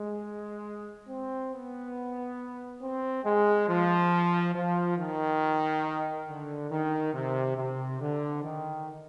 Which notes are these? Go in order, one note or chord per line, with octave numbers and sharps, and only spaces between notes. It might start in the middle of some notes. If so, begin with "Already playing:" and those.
Already playing: G#3
C4
B3
C4
G#3
F3
F3
D#3
D3
D#3
C3
C3
D3
D#3